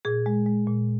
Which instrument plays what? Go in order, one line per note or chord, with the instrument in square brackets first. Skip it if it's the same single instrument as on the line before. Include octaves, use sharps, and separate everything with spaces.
[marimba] A#2 G#4
G#3
G#3
A#2